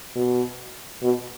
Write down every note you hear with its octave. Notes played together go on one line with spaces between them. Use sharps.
B2
B2